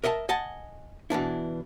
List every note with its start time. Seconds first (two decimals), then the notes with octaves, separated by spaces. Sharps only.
0.04 A#4 D#5 E5 F#5 A5
0.29 D#5 F#5 G#5 A5
1.10 B2 E3 D4 E4